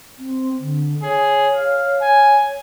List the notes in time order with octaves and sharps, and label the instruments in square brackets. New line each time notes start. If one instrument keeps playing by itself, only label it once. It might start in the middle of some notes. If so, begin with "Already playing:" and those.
[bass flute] C4
D3
[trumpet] G#4 [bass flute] C#5
[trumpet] F5
G#5